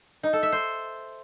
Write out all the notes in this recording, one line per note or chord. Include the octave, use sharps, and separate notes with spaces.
D#4
A4
E5
C5